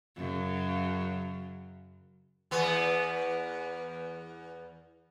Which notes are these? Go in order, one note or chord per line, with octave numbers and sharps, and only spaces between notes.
F#2 C#3
E2 B3